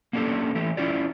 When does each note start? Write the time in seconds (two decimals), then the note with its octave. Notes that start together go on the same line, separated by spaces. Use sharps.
0.13 A#3 C#4 D4 G4 A4
0.55 E3 A3 G4 A4
0.77 C#4 E4 F4 G4 D5